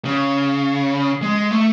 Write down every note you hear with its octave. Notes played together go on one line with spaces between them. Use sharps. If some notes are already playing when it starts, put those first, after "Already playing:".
C#3
G#3
A3